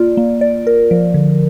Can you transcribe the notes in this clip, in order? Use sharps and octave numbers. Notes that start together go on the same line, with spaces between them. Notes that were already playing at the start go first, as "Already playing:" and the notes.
Already playing: A#3 F4 D5
A#3
D5
A#4
F3
D3